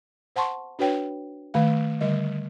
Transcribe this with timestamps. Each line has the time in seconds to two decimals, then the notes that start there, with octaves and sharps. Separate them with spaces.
0.36 C5 F#5 A5 C6 C#6
0.79 D4 F#4 B4 C#5 G5
1.54 D#3 A3 F5
2.01 D3 G3 D#5